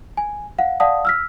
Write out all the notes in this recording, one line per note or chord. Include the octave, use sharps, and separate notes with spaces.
G#5
F5 F#5
D5 F5 F#5 A5 D#6
E6 F6 B6